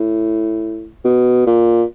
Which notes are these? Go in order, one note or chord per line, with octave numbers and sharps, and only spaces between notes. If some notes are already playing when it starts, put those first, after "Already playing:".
Already playing: A2
B2
A#2